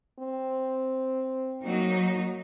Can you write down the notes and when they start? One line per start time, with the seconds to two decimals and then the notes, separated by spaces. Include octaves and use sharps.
0.19 C4
1.63 F#3 A#3 D#4